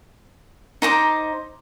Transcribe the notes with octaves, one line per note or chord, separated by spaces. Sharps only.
D#4 C5 A#5 D6